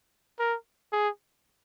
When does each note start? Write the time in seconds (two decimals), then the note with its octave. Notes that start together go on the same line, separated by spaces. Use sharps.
0.39 A#4
0.92 G#4